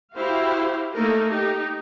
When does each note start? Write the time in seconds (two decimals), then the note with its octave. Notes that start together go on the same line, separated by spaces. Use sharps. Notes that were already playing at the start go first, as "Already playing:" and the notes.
0.16 E4 F#4 G4 C5 F5
0.93 A3 A#3 D#4 A4 A#4
1.30 D#4 G4